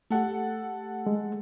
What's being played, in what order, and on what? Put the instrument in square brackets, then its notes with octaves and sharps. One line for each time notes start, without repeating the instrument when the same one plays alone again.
[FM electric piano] A3 G4 [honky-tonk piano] A4 F#5
[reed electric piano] G#3